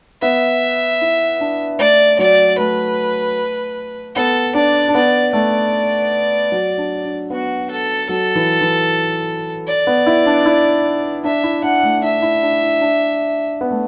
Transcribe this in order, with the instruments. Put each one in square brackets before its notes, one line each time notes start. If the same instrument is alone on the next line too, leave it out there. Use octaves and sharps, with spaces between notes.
[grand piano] B3 [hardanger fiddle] E5
[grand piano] E4
D4
[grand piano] A3 [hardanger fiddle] D5
[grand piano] F#3 [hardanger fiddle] D5
[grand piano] A3 [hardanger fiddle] B4
[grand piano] B3 [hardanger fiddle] A4
[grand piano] D4 [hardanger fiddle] D5
[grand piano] D4
[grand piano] B3 [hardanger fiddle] D5
[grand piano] A3 [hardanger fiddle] D5
[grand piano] F#3
D4
D4
[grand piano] B3 [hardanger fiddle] F#4
[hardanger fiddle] A4
[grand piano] F#3 [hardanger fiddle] A4
[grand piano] E3
E3
[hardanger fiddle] D5
[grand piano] B3
E4
D4
E4
[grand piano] D4 [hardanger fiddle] E5
[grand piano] E4
[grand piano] D4 [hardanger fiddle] F#5
[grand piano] A3
[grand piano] D4 [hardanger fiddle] E5
[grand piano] E4
D4
E4
D4
B3
A3